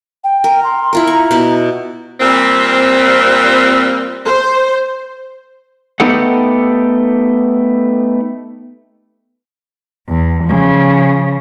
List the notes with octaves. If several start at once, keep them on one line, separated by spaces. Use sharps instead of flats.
G5
A#4
C6
E4 F4 A#4
A#5 C#6
B2 E4 B4
A#2 G3 C4
C5
A3 B3 D#4 G4 A4 F#5
E2
C#3 F3